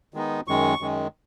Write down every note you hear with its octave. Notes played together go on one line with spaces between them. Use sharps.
D#3 G#3 B3 D#4
F#2 D#3 G#3 C#6
F#2 D#3 G#3